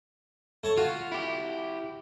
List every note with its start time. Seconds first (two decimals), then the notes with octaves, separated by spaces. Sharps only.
0.64 A3 C#5 A5
0.77 F4 F#4
1.12 E4 G4